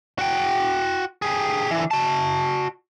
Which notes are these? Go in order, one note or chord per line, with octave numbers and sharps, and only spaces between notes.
F#4 G5
G4 G#4
D3 E3
F#4 A5